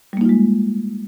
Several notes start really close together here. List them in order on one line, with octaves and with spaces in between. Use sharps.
G3 A#3 D#4 F4 G#3